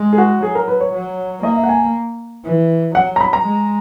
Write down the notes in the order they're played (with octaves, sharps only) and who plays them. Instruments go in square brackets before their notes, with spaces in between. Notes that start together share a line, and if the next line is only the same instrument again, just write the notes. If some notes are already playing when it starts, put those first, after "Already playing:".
Already playing: [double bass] G#3
[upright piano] G#4
F#4
[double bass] F#3 [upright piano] G#4
[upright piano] A#4
B4
C#5
[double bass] F#3
[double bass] A#3 [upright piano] D#5
[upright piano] E5
F#5
G#5
[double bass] E3
[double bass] F#3 [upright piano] F#5
[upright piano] A#5
B5
A#5
[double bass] G#3